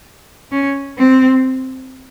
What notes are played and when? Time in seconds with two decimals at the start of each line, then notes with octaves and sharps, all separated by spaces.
0.52 C#4
0.98 C4